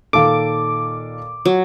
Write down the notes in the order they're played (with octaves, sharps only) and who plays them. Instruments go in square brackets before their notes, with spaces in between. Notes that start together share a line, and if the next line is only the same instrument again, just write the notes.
[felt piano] A#2 D#3 [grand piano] A4 F5 [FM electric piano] D6
[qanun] F#3